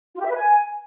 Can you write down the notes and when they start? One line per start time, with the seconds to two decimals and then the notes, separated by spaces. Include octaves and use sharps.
0.15 F4
0.20 G4
0.25 E5
0.30 B4
0.36 G#5